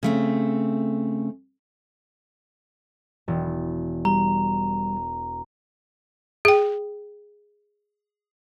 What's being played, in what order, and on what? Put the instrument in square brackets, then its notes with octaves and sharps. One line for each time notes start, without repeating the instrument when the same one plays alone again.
[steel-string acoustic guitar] C#3 A3 C4
[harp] E1
[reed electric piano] G3 [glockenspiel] A#5
[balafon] G#4 G5